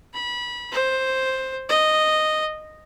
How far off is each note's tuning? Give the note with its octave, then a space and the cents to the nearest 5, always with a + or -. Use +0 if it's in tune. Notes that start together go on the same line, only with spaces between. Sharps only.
B5 -25
C5 +5
D#5 -5